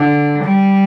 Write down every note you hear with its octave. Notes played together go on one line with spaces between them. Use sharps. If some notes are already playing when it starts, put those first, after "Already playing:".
Already playing: D3
G3